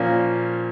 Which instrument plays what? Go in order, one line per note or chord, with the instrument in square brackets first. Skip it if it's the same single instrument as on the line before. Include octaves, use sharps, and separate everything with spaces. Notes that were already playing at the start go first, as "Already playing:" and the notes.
Already playing: [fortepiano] A#2 F3 A#3 C#4